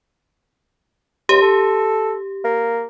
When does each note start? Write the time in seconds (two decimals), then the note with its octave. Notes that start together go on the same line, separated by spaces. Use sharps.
1.29 C#2 G4
1.42 A4
2.44 A#3